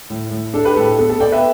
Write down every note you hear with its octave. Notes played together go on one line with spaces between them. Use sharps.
A2
A2
D4 A4
G4 B4
A2 A4
A4
B3 A4
A4
B3 D5 G5
B4 E5